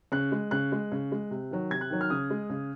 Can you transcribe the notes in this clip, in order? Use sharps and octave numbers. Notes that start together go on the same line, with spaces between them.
C#3 F#6
G#3
C#3 F#6
G#3
C#3
G#3
C3
D#3 F#3
C3 G#6
F#6
D#3 F#3
F6
C#3 D#6
G#3
C#3